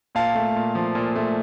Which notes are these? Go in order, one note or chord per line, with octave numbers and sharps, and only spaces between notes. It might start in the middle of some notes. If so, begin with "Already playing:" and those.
A#2 F5 A5
A3
A#2
F3
A#2
A3